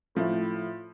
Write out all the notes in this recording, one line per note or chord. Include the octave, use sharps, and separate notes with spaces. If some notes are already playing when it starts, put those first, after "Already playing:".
A2 F3 A3 E4